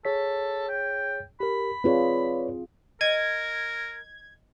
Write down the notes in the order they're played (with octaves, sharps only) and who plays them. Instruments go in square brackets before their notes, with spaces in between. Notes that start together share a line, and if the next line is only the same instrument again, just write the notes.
[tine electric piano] G#4 C#5 B6 [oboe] A4
[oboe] G5
[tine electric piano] G4 A#4 [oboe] B5
[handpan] C4 F4 G#4 [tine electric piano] B4 C#5 D5
[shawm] A#4 [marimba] D#5 [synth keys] G#6